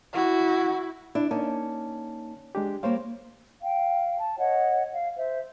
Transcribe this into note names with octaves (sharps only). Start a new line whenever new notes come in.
E4 F#4
D4 E4
A#3 C#4 D#4 A5
G#3 D4 G4
G3 A#3 C5 C#5 F5
F5 G5
A5
C#5 D#5 F#5
F5
C5 E5